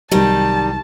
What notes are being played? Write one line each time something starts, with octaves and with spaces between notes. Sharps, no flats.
C2 D#3 F#3 G3 A5